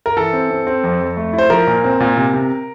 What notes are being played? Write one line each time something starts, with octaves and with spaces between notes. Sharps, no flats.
A#4
E3 A4
C4
C4
C4
F2
F2
A3
E4
C5
F3 A#4
A#2
C4
A#2
C3
C3